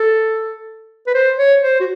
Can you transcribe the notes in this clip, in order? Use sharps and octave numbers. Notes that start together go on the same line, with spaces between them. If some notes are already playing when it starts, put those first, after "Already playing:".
Already playing: A4
B4
C5
C#5
C5
F#4